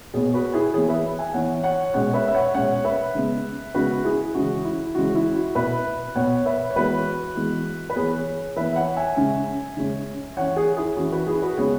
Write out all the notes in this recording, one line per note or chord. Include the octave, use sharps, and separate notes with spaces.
B2 B3 G#4 C#5
F#4 B4
E4 G#4
E3 B3 G#4 C#5
B4 E5
E5 G#5
E3 B3 C#5 F#5
C#5 F#5
B2 G#3 C#4 C#5 F#5
B4 E5
E5
C#5 F#5
B2 G#3 C#4 C#5 F#5
B4 E5
C#3 G#3 B3
C#3 G#3 B3 F#4 B4
E4 G#4
C#3 E3 G#3 C#4 F#4
E4
C#3 E3 G#3 C#4 F#4
E4
F#4
B2 B3 B4 E5
B2 B3 C#5 F#5
B4 E5
C#5
E3 G#3 B3 F#4 B4
E3 G#3 B3
B4
E3 B3 G#4 C#5
E3 B3 B4 E5
E5
C#5 F#5
E5 G#5
C#3 G#3 C#4
C#3 G#3 C#4
E3 C#4 C#5 F#5
G#4 C#5
E4 G#4
E3 C#4 F#4
F#4 B4
E4 G#4
F#4 B4
C#3 G#3 B3 G#4 C#5